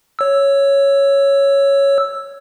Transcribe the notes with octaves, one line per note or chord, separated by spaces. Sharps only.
C#5 E6